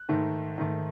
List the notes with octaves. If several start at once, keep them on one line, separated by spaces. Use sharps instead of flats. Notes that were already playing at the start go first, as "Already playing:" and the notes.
Already playing: F#6
G#2 D#3 A3
G#2 D#3 A3